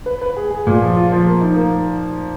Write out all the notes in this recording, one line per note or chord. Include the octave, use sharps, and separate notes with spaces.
B4
B4
G#4
G#4
A#2
F3
F4
F3
A#3
D#4
A#3